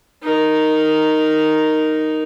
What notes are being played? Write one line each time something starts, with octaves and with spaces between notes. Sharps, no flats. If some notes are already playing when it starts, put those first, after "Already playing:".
D#4 A#4